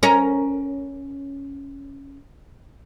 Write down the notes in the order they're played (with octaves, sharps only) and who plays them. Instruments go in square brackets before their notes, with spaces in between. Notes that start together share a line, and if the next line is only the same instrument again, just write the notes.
[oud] C#4 A#4